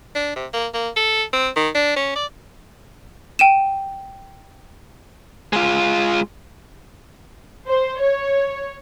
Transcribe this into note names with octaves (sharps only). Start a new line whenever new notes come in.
D4
C3
A#3
A#3
A4
C4
D#3
D4
C#4
D5
G5 D#7 E7
G#3 F4
C5
C#5